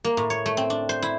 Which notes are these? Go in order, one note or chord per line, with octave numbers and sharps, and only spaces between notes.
A#3
A2
C#5
A3
C4
D4
C5
E4